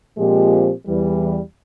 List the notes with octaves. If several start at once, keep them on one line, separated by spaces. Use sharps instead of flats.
A#2 F3 G#3 C4 G4
E2 E3 G3